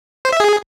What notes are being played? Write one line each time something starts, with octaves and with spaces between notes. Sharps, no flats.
C5
E5
G#4